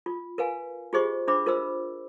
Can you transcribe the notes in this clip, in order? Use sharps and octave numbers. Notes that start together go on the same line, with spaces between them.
F4
A#4 B4 F5 G#5
F4 G4 G#4 C5 D#5 C#6
D4 C5 E5 B5 D6
F4 A#4 C5 D#5 B5 E6